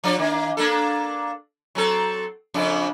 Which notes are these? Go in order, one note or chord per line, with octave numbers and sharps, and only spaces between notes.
F3 D4 D5
D#3 A#3
A#3 D4 A4
F#3 C4 A4
F2 C#3 D4